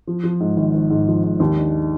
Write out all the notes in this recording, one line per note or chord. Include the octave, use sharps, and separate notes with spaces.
F3
F3
G#2
G#1
G#1
G#2
F3
G#2
D#2
D4